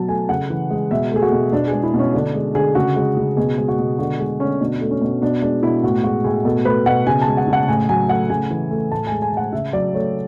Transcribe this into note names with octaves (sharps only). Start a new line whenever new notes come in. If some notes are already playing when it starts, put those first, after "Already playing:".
Already playing: B2 F#3 A5
A3 G#5
C#3 F#5
E3
G#3
B2 E5
A3 G#4
F#4
B2
B2 D4
G#4
G#3
E4
B2
C#4
D3 D4
G#3
D3 G#4
C#3 F#4
G#3
C#3
B2 G#4
G#3 G#4
F#4
B2
D3 F#4
G#3 G#4
D3 C#4
B2 D4
A3
C#4
B2
B2 D4
G#3 D4
B2 E4
A2 F#4
G#3 F#4
A2 G#4
B2 A4
A3 B4
B2 F#5
C#3 G#5
A5
G#3
F#5
C#3 F#5
A2 G#5
F#3 G#5
A3 F#5
C#3 G#5
E3
A3
A2 A5
G#3 G#5
G#5
A2
F#5
C#3 E5
F#3 D5
A3 C#5